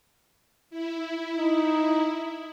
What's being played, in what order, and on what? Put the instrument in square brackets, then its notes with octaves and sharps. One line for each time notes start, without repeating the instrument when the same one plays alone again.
[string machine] E4
[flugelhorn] D#4